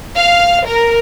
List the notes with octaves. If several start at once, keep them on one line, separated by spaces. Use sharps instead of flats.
F5
A#4